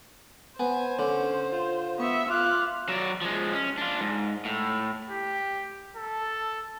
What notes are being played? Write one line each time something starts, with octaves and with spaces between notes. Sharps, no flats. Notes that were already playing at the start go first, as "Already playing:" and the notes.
B3 C5 G#5
D3 C#4
F4
B3 E5 C#6
F4 F5 D6 F#6
F#3 D5
F3 G#3
C#4
D4 F4
G#2
A2
G4
A4